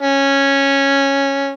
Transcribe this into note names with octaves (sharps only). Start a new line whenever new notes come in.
C#4